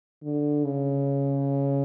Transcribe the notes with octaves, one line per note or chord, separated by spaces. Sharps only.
D3
C#3